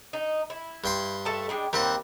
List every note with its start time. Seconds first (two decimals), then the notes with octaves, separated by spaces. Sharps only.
0.13 D#4
0.50 E4
0.84 G2 G5 C6
1.25 A3 A4 A5
1.49 G3 G#3 D4
1.73 D#2 G3 C4 F#5